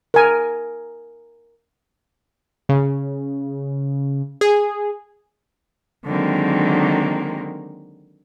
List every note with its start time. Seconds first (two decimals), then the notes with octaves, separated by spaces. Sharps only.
0.14 A#4 G#5
2.69 C#3
4.41 G#4
6.05 D3 D#3 F#3 G#3 A#3 C4